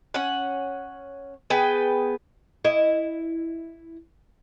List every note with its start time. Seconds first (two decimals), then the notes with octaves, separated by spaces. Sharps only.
0.14 C#4 F#5
1.50 B3 G#4 B4 G5
2.65 E4 D#5